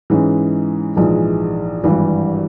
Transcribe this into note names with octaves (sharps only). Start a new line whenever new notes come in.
G#2 E3 G#3 C#4
A#1 G#2 E3 G#3
G#1 G2 E3 G3